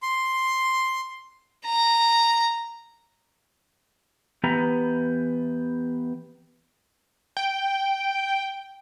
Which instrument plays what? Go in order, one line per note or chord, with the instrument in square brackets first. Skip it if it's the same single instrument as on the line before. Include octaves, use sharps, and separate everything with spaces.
[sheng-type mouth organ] C6
[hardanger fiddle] A#5
[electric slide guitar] E3 B3 G4 B4 A#5
[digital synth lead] G5